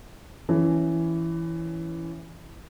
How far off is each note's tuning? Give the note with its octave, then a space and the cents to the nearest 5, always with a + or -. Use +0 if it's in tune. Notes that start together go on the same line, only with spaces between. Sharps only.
E3 +5 C#4 +10